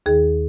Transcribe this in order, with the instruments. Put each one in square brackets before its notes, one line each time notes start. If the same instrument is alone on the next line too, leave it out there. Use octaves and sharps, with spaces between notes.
[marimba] D#2 D#3 G#4